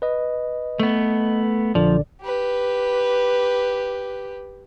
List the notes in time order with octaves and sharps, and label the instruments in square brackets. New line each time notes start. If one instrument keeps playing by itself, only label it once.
[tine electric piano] B4 D#5
[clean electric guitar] A3 B3
[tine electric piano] A#1 D3 D5 [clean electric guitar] F3
[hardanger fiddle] G4 B4